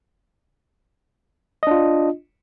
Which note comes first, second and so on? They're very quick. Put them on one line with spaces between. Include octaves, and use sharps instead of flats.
D#5 D4 F4